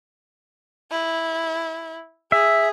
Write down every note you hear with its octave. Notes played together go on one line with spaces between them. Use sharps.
E4
G#4 E5